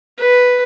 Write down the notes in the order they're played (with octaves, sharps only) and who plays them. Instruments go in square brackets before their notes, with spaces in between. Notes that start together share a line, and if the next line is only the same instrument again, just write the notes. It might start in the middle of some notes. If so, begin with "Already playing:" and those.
[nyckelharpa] B4